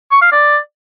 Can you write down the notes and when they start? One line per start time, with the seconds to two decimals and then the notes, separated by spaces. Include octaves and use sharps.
0.11 C#6
0.22 F5
0.32 D5